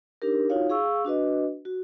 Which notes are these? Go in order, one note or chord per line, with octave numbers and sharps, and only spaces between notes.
D4 D#4 G4 A#4
D#4 F4 F#4 C#5 F5
G#4 F5 C#6 E6
D4 F#4 B4 D#5
F#4